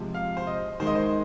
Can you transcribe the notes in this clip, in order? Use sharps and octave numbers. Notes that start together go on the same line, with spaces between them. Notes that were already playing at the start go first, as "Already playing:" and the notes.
Already playing: C3 F3 G#3
F5
C5
D#5
D#3 G#3 C5
D#5
C5